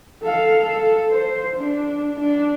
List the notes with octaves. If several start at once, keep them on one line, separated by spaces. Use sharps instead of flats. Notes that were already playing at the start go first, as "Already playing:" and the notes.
A4 F5
A4
C5
D4
D4